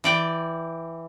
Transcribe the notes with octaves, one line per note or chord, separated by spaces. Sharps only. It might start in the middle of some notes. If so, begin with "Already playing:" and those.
E3 D5 G5